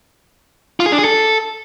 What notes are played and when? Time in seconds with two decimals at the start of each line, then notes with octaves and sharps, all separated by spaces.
0.80 F4
0.86 G#4
0.92 D4
0.98 G#4
1.04 A4